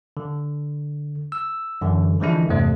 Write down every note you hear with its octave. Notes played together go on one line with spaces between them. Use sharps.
D3
E6
F#2 D3 E3
D3 E3 F3 G#3 D4 E4
E2 G2 C3 A3 C5